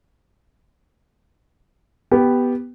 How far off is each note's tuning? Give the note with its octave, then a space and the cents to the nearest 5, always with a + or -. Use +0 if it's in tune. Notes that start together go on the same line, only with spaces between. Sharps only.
B3 +0 G4 +0